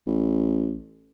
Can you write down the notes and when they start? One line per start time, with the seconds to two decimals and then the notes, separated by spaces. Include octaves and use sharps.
0.07 A1